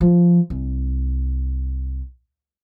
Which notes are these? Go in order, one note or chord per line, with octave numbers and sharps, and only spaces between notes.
F3
C2